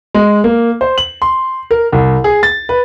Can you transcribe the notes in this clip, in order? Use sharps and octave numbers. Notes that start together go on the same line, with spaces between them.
G#3
A#3
C5
F#7
C6
A#4
C2
G#4
A6
B4